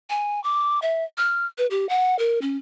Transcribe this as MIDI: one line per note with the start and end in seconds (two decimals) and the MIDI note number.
0.10 0.42 80
0.44 0.79 86
0.82 1.04 76
1.18 1.46 89
1.58 1.67 71
1.71 1.88 67
1.89 2.17 78
2.19 2.39 70
2.42 2.57 61